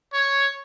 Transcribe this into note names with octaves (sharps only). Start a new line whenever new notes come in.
C#5